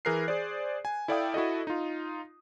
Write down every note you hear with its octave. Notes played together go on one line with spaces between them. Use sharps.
E3 G#4 A#4 F#6 C7
G#4 C5 D5
G#5
E4 A4 D5 F5 G5 D#6
E4 F#4 A4 D#5
D#4 F4